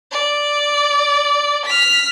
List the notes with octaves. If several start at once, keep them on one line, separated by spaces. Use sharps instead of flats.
D5
F6 B6